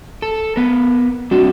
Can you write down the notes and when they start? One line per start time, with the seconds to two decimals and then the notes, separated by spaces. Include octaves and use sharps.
0.22 A4
0.56 B3 A#4
1.31 G3 C4 D4 F#4